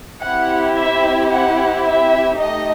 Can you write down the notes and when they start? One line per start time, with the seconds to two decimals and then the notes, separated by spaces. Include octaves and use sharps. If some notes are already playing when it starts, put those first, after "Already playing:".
0.22 C4 E4 G4 F#5
0.77 E5
1.31 F#5
1.85 E5
2.39 A3 D#4 G4 D#5